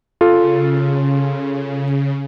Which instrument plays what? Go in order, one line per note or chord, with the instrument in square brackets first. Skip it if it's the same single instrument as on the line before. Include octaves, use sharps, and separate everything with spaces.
[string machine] C#3 [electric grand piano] F4 A4